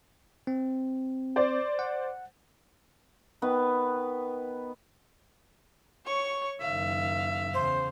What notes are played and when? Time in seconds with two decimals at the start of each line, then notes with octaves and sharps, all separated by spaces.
0.47 C4
1.36 C5 D5
1.79 F#5
3.42 D#3 B3 B4
6.06 C#5 C#6
6.61 F#1 D#3 E5 F5
7.54 E2 C#3 C5